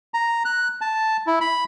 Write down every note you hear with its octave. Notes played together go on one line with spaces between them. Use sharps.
A#5
F#6
A5
E4
B5